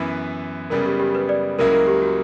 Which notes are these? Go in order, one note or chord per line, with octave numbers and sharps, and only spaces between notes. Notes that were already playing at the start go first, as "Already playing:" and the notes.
Already playing: F#2 E3 B3 E4
F#2 C#3 G3 B3 A#4
G4
G4
B4
D5
C#2 C#3 F#3 A#3 E4 A#4
A#4
G4
F#4